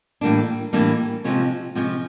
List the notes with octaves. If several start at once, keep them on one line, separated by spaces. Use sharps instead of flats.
A2 E3 G3 A#3 D4
A2 E3 G3 A#3 D4
C3 F3 G#3 C#4 F4
C3 F3 G#3 C#4 F4